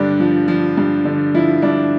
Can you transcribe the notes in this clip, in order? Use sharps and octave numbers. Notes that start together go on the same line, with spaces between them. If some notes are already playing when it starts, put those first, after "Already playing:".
Already playing: G2 D3 D4
F3
F3
G2
D3
F3 E4
G2 D4